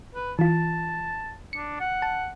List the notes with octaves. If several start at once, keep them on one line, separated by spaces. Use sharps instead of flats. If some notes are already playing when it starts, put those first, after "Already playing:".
B4
E3 F4 A5
D4 C#7
F#5
A5